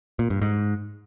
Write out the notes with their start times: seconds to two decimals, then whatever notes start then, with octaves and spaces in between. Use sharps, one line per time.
0.19 A#2
0.30 G2
0.42 G#2